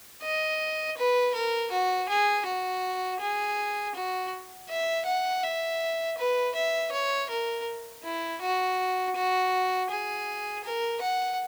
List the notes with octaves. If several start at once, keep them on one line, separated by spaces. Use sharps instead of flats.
D#5
B4
A#4
F#4
G#4
F#4
G#4
F#4
E5
F#5
E5
B4
E5
C#5
A#4
E4
F#4
F#4
G#4
A#4
F#5